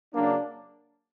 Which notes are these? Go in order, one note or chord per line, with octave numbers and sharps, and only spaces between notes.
C#3 F#3 A#3 D4